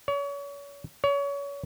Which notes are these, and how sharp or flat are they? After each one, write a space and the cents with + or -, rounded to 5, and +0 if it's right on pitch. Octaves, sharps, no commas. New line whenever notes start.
C#5 +35
C#5 +30